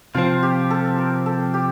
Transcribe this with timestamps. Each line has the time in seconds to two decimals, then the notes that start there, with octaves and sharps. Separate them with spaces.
0.14 C3 F3 C4 F4
0.43 G4
0.70 A4
0.98 A#4
1.26 A4
1.54 G4